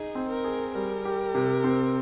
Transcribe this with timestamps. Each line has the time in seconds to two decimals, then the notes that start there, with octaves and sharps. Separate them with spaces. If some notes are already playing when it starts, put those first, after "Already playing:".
Already playing: D#4 G#4
0.15 C4
0.29 A#4
0.44 G#4
0.75 G3 A#4
1.05 G4
1.35 C3
1.64 C4